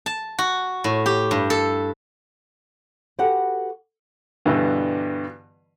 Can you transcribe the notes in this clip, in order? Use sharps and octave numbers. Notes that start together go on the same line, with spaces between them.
A5
F#4
A2
G4
G2
A4
F#4 G4 A4 B4 F#5
G2 B2 D3 E3 B3